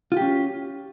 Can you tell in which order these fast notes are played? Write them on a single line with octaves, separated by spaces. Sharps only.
F4 G4 C#4